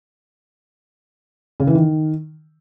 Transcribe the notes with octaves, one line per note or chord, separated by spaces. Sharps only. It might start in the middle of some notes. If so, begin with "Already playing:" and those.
C#3
E3
D#3